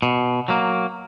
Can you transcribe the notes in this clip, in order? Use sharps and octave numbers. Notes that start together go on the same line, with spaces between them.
B2
F#3 A#3